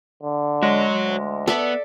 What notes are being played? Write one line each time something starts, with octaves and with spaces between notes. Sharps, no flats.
D3
G#3 F#4 C#5
D2
B3 A4 D5 E5